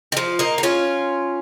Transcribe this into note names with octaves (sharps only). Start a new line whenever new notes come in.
D#3
F3
A#3 D#4
D#4
C#4 F4